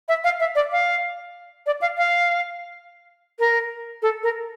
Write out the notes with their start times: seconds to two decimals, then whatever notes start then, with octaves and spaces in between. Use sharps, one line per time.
0.08 E5
0.24 F5
0.40 E5
0.55 D5
0.72 F5
1.66 D5
1.81 F5
1.98 F5
3.39 A#4
4.02 A4
4.23 A#4